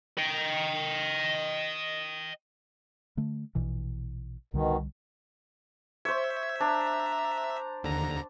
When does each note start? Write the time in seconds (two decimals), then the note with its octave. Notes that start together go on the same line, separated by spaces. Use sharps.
0.18 D#5 G5
3.17 D3 A3
3.55 A#1 B2 E3
4.54 C2 B2 D3 D#3 G3
6.05 C5 C#5 E5
6.61 D4 A#5
7.83 D#2 D3 A#5